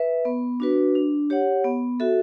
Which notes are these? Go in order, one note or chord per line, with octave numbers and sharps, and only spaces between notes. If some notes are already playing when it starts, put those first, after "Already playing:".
Already playing: B4 E5
B3
D4 F#4 B4
D4
G4 C#5 F#5
B3
F#4 A4 E5